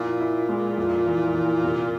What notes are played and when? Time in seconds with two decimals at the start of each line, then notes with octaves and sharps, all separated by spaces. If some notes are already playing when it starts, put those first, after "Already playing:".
Already playing: A#2 F3 E4
0.20 E4
0.49 G#3
0.78 F2
1.06 E3
1.34 E3
1.63 C3